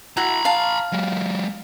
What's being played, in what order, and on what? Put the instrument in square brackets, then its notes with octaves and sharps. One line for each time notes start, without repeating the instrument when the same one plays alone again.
[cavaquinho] E4 F#4 [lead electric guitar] A#5 B5
[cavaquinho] F5 A5
[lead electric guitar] F#3 G#3